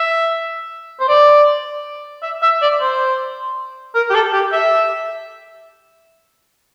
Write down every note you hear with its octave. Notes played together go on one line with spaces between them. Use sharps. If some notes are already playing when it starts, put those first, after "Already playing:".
Already playing: E5
C5
D5
E5
E5
D5
C5
A#4
G4
A4
G4
E5